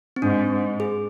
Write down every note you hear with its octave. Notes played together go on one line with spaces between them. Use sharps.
C4
G#2 D4
G#2
G#4